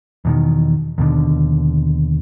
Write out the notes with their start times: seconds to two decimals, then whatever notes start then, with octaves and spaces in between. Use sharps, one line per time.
0.25 E2 B2 D#3
0.98 D#2 B2 D3